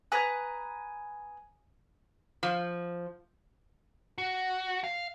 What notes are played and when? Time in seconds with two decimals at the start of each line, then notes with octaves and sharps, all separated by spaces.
0.12 B4 G#5 A#5 D#6 F#6 G#6
2.43 F3
4.18 F#4
4.84 F5